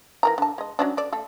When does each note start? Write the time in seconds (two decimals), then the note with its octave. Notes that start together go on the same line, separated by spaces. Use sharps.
0.23 E3 A#4 A#5
0.38 D3 A5
0.58 G#3 D#5
0.79 F#3 C#4 D4
0.97 A4 D5
1.13 A3 A4